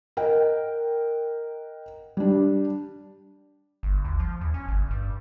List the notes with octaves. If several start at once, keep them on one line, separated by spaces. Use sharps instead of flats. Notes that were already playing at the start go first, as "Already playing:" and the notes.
A#4 D#5 F#5 G5
G3 D4
G1
D2
F3
E2
C#4
G1
G2